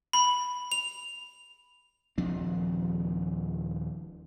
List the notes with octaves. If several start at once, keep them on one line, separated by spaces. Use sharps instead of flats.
B5
F7
D#1 F3 C4 D4